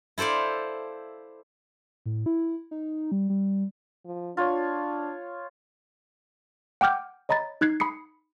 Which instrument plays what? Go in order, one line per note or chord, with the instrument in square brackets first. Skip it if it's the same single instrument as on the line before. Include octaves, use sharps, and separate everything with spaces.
[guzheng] E4 A4 C5 D5 F5
[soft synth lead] A2
E4
D#4
G3
G3
[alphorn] F3
[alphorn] D4 [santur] F4 C#5
[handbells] F#5 G5 D6 F6 G6
C#5 D#5 A#5 B5 A6
D#4 F#6 G#6 C7
B5 D#6 C7 C#7